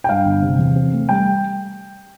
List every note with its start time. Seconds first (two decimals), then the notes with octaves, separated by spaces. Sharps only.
0.04 G5
0.09 G2 F5
0.25 G1
0.42 C3
0.58 E2
0.76 C4
0.93 A3
1.09 G3 G5